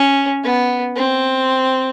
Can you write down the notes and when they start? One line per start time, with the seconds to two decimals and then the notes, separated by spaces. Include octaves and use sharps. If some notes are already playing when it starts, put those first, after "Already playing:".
Already playing: C#4
0.44 B3
0.96 C4